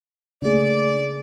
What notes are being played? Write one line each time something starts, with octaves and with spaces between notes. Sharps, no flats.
C#3 A3 A#3 D4 G#4 D5